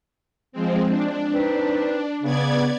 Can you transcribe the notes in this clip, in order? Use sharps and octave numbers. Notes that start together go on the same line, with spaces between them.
F3 G#3 C4
D4
C4 D#4 B4
C#3 B3 D5 G#6